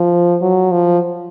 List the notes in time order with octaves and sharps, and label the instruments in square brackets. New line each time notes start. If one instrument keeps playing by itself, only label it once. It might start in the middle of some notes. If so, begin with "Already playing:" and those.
Already playing: [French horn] F3
F#3
F3